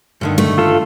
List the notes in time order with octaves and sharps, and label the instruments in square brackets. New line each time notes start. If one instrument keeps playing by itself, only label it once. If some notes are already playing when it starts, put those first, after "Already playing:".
[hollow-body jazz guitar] G2 D3 D#3
[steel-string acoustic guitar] A3
[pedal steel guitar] F4 A4